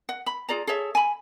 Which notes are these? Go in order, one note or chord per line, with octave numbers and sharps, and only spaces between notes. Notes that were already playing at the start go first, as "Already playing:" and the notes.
F#5
B5
F4 G#4 D5 A#5
G#4 A4 C#5 E5
G#5 B5